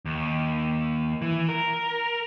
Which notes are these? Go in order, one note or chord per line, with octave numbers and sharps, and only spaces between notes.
D#2
E3
A#4